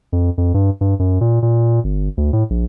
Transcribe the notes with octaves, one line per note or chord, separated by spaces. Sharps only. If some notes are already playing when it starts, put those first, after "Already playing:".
F2
F2
G2
G2
F#2
A#2
A#2
G1
D2
A2
A#1